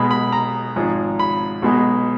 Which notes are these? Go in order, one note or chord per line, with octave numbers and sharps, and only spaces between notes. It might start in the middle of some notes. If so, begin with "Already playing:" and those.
Already playing: B1 B2 G#3 B5
B5
A#5
G#1 G#2 F3 G#3
B5
B1 B2 G#3